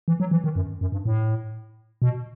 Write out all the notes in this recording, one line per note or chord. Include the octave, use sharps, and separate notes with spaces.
E3
F#3
E3
D#3
F#2
F#2
G2
A2
B2